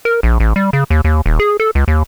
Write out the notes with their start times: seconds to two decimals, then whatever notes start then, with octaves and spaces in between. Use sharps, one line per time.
0.05 A#4
0.23 A#1
0.40 A1
0.56 G3
0.73 C#3
0.90 D#2
1.05 D#2
1.26 D#1
1.40 G#4
1.60 A4
1.75 C#2
1.88 D#2